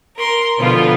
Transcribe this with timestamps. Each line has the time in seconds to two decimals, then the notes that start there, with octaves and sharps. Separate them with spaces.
0.15 A#4 C6
0.59 B2 D3 F3 B3 F4